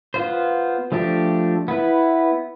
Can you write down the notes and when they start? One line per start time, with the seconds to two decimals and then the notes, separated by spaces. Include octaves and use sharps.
0.14 B3 F4 C5
0.92 F3 A3 D4 G4
1.68 B3 E4 B4